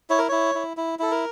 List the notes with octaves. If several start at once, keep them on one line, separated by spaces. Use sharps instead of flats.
E4 C#5
A#4
E4 C#5
E4
E4
E4 A4
A#4